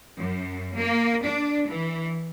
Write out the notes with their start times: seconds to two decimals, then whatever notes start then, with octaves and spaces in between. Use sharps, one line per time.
0.16 F#2
0.76 A#3
1.22 D4
1.67 E3